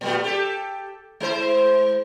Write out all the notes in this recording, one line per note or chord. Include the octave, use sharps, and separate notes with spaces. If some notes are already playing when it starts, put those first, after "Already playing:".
A#2 G3 A3
G4 A4
G#3 E4 C5